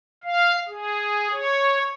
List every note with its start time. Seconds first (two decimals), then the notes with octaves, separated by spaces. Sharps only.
0.24 F5
0.68 G#4
1.32 C#5